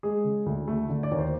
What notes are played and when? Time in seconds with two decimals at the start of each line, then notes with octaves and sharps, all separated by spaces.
0.03 G#3 G#4
0.24 C#3
0.46 D2
0.68 A3
0.89 D3
1.03 D5
1.11 D#2 C#5
1.19 C5